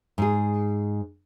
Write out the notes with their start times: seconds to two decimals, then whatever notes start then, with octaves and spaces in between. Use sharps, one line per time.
0.18 G#2 G#4